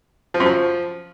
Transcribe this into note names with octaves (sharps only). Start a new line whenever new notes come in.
F3
F#2
F3